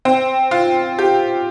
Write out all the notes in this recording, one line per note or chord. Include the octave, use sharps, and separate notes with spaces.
C4
F4
G4